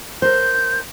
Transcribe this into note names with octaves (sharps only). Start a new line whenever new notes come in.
A#4 C5 G6